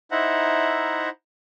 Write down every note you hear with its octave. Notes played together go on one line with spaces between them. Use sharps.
D#4 E4 C5 E5 F#5 A#5